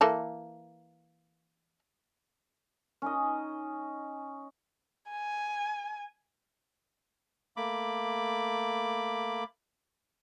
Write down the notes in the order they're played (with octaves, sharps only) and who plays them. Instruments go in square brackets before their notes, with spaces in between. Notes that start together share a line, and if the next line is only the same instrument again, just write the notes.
[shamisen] E3 A#3 A4
[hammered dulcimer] C#4 D#4 D#5
[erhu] G#5
[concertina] A3 A#3 B5 D6